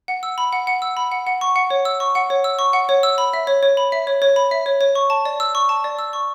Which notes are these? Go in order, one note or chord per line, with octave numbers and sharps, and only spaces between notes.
F#5
E6
B5
F#5
F#5
E6
B5
F#5
F#5
C#6
F#5
C#5
E6
C#6
F#5
C#5
E6
C#6
F#5
C#5
E6
B5
E5
C#5
C#5
B5
E5
C#5
C#5
B5
E5
C#5
C#5
C#6
A5
D5
E6
C#6
A5
D5
E6
C#6